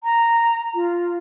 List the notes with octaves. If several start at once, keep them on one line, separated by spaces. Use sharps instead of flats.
A#5
F4